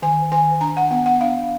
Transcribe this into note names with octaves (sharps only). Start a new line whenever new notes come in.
D#3 G#5
D#3 G#5
D4 A#5
F#5
B3 F#5
F#5
D4 F5